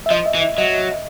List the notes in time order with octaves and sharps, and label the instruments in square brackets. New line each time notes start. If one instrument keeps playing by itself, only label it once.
[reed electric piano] E5
[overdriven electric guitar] F3 [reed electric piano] D#5
[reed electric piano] E5
[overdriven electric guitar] E3
[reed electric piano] E5
[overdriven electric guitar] F#3 [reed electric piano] D#5